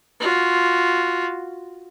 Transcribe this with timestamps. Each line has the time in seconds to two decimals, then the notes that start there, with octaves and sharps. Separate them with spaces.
0.20 F4 F#4